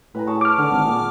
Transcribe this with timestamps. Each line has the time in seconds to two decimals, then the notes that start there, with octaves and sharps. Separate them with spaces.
0.15 A2 B4 G#5 A#5
0.27 G#4 C#5 A5
0.41 D6 F6
0.58 D3 D4 F#5
0.72 G#1
0.85 A#2 G#4 G5 A5